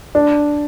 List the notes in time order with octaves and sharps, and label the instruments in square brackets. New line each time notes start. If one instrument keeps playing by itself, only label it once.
[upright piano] D4